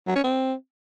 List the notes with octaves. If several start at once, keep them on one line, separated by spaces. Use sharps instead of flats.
F#3
C#4
C4